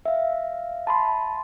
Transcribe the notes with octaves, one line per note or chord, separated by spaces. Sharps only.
E5 F5
A5 B5 C6